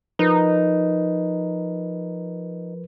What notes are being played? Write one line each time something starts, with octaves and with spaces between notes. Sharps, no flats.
F3 D#4 A#4 B4